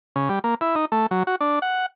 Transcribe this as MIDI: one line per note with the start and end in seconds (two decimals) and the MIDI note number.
0.16 0.29 49
0.29 0.39 55
0.44 0.55 58
0.61 0.75 64
0.75 0.85 63
0.92 1.06 57
1.11 1.23 54
1.27 1.36 66
1.41 1.59 62
1.62 1.86 78